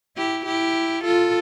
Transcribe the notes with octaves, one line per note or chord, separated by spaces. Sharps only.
E4 G4
E4 G4
F4 A4